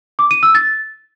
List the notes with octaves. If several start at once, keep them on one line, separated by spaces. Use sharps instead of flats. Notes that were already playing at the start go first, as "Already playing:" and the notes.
D6
D#7
E6
A6